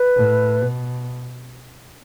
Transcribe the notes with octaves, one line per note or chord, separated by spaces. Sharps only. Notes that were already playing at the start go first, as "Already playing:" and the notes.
Already playing: B4
A2
B2